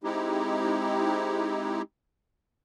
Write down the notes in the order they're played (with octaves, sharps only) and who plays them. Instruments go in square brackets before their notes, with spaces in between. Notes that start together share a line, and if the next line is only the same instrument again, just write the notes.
[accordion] G#3 C4 D#4 E4 G4